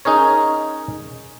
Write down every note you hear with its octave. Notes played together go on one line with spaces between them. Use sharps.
C#4 D#4 G#4 A#4 C#5